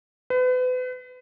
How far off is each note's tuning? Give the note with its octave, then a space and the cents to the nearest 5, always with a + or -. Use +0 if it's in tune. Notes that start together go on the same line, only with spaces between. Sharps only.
B4 +35